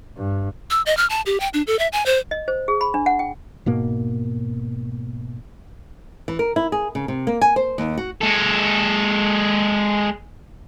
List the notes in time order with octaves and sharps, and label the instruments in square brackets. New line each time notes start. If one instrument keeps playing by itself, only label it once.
[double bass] G2
[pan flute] E6
D#5
F6
A5
G4
G5
D4
A4
E5
G#5
C5
[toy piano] D#5
C5
G#4
B5
D4
F#5
G5
[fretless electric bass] G#2 B2 A#3
[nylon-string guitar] E3
A#4
E4
G#4
C#3
C3
A#3
G#5
C5
D#2
F#4
[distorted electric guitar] G#3 A4